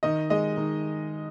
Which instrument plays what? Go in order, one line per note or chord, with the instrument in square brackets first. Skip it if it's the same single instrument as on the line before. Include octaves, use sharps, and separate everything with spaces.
[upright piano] D#3 D#5
G#3 D#5
D#3